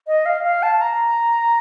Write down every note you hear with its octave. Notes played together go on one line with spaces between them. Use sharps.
D#5
F5
F5
A5
A#5